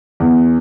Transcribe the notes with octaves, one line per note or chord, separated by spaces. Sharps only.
E2